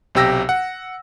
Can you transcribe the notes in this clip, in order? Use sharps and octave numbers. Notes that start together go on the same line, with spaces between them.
B1 C3 G4 E6 A#6
F#5